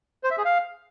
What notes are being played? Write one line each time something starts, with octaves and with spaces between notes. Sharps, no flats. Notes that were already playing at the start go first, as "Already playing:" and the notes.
C5
E5
G#4
F5